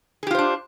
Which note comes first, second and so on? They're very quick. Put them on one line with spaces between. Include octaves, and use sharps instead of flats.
G#4 G4 F4 C5 D4